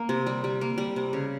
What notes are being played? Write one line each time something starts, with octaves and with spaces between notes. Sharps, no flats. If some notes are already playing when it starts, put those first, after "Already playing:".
Already playing: A#3
C3
G3
G3
A#3
G3
C3
C#3